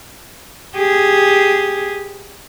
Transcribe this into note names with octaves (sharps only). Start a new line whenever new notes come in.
G4 G#4